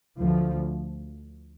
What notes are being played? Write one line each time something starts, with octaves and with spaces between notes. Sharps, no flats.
D2 F3